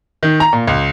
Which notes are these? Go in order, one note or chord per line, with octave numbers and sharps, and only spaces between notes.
D#3
A#5
A#2
C#2